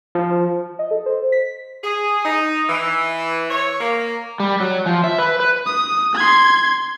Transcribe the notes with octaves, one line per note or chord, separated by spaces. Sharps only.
F3
D#5
A4
C5
B6
G#4
D#4
E3
C#5
A#3
G3
F#3
F3
E5
B4
B4
D#6
C6 G#6